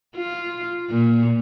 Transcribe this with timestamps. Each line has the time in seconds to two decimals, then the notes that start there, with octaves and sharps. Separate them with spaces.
0.17 F4
0.90 A#2